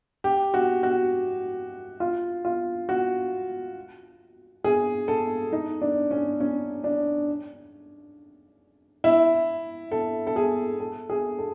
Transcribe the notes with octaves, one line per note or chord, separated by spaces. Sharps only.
G4
F#4
F#4
F4
F4
F#4
G#4
A4
D#4
D4
C#4
C#4
D4
E4
A4
A4
G#4
A4
G#4
A4